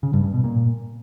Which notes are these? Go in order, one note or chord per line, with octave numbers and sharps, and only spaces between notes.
C#3
G2
G2
B2
A#2